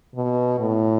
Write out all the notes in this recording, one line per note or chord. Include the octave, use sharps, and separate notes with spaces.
B2
A2